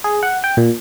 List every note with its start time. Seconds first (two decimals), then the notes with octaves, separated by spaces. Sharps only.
0.04 G#4
0.23 F#5
0.44 G5
0.57 A#2